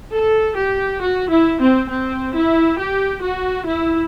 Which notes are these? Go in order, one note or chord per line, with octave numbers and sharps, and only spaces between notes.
A4
G4
F#4
E4
C4
C4
E4
G4
F#4
E4